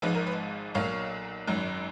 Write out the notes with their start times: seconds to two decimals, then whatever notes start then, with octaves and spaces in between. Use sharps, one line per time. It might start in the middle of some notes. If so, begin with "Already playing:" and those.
0.02 G#1 G#2 F3 G#3 B4
0.15 A#4
0.27 B4
0.74 B1 A#2 F#3 C#5 F5
1.47 G#1 F#2 D#3 F#3